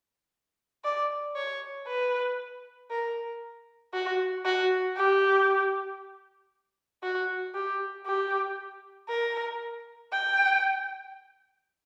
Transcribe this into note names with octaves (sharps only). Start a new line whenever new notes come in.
D5
C#5
B4
A#4
F#4
F#4
G4
F#4
G4
G4
A#4
G5